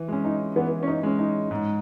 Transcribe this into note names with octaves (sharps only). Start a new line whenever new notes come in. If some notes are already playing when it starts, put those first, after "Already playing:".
Already playing: E3
G#3 C#4
D#4
E3 B3
C#4
D#4
G#3 C#4
D#4
G#2